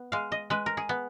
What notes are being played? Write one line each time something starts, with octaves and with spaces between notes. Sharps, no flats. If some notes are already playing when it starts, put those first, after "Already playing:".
Already playing: B3
G#3 F5
D#5
G#3 B4
A#4
G#4
B3